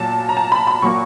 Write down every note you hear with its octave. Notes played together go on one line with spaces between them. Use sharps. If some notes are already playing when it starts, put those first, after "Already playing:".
Already playing: A#2 F#3 A5
A#5
A5
B5
B5
A#2 F#3 A#3 C#6